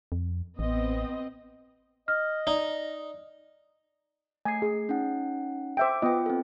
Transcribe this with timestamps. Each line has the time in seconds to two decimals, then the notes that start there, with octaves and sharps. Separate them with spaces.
0.12 F2
0.59 A1 B3 C4 D#5
2.08 D#5 F6
2.47 D#4 D5
4.45 A3 G#5 C7
4.62 G#4
4.89 C#4 D#4 F#5
5.77 C5 E5 G5 D6 D7
6.02 B3 F4 D#5 G5
6.26 C4 A4